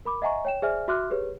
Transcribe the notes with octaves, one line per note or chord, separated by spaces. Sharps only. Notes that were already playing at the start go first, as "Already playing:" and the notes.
A#4 B5 D6
D#5 E5 F#5 G#5 A#5 C#6
C#5 G5 E7
G#4 C5 D5 E5 G#5 F6
F#4 E5 C6 D6 F6 F#6
G4 G#4 B4 C#5